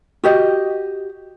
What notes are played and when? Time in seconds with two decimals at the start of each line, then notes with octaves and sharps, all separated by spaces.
0.24 F#4 G4 D#5